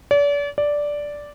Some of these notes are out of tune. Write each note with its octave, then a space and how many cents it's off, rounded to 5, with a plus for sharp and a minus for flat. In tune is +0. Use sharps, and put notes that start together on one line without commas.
D5 -40
D5 -5